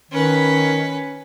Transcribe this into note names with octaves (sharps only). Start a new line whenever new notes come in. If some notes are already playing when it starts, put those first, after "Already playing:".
D#3 C#4 B4